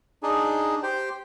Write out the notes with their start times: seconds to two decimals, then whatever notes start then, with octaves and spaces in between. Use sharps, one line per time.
0.23 D4 D#4 G#4
0.83 G4 C5 G5